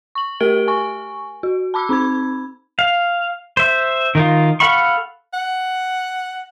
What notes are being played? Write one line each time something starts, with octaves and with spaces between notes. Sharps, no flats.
C#6 F#7
A3 G4 A#4 D7 G7
G#5 C#6
F#4
A5 B5 D6 E6
C4 D#4 B5 G#6
F5
C5 E5
D#3 D#4 F4
A4 F5 F#5 B5 C#6
F#5